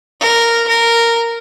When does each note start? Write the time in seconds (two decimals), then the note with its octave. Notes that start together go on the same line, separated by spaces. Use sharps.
0.20 A#4
0.68 A#4